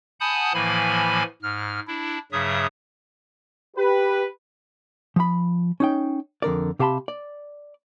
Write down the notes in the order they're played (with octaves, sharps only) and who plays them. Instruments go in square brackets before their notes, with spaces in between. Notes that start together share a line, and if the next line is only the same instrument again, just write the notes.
[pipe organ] F#5 G#5 A5 B5 D#6 G6
A2 E3 F3 A#3 G#5 B5
G#2 F6
D4 E4
G2 C#3 F#3 E5 D#6
[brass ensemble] G4 B4
[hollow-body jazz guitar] F3 B5
C#4 D#4 G5
F2 D3 A#4 D5
C3 G4 F5 A5 B5 C6
D5